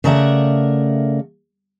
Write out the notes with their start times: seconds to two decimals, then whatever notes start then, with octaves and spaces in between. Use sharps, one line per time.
0.04 C#3 A3 A#4 D5 E5 F#5